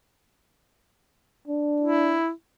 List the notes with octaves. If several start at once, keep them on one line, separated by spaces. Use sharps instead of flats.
D4
E4